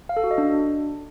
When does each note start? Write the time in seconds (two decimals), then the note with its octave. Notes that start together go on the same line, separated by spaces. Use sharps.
0.09 F5
0.17 A4
0.24 F#4
0.31 D#5
0.38 D4